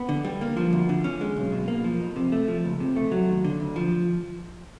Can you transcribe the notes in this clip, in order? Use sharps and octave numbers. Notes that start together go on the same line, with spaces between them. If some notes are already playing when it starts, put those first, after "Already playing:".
Already playing: B3
D3
G3
A#3
F3
D2
D3
C#4
G#3
B1
B2
A#3
F3
F2
C3
A3
F3
C#2
C3
A3
F#3
D#2
D3
D2
F3